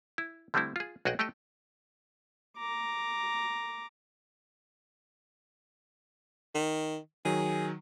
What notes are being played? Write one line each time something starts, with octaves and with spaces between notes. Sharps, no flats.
E4
D3 G3 A3 C4 E4
F4 G#4
B1 F#4 G#4 D#5 F#5 G5
A3 G4 A4 D#5 G5
A#5 D6
D#3
D#3 F#3 G#4